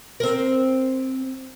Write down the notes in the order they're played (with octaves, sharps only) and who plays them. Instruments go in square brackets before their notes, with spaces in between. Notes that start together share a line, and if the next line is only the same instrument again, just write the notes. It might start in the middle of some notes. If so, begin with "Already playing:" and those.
[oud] C4 A#4